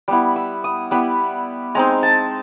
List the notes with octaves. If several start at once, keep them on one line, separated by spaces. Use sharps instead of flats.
G3 B3 E4
E6
D#6
G3 B3 E4 B5
G#3 C4 D#4 A#5
A5